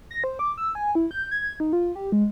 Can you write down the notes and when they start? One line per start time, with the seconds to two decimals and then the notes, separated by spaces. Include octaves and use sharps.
0.11 A#6
0.24 C5
0.39 D6
0.58 E6
0.75 G#5
0.95 E4
1.11 G6
1.31 G#6
1.60 D#4
1.73 F4
1.96 G4
2.12 G#3